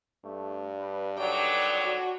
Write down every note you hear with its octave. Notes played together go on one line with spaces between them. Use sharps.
G2 A3
B4
D3 D#3 F#3 D5 G5
F#4